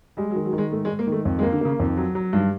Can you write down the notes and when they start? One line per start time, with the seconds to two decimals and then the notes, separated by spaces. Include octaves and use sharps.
0.17 G3 G#3
0.30 F#3
0.36 D#3
0.45 F#3
0.53 D#3
0.58 G#3
0.71 G#2 A3
0.85 G#3
0.89 G#2
0.99 A#3
1.07 D#3
1.12 A3
1.25 F2
1.39 G#3
1.43 A#3
1.52 D3
1.61 C#3 A#3
1.79 F2 D#3
1.97 F#3
2.15 F#3
2.33 G2 D#3